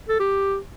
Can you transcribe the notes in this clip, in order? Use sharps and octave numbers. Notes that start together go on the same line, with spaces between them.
A4
G4